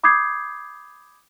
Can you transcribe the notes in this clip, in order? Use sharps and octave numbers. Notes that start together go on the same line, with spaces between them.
B5 D6 D#6 G6 G#6 C7